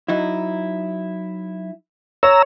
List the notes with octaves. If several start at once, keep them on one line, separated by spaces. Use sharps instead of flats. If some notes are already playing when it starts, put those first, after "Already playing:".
F#3 D#4 E4
C#5 A#5 E6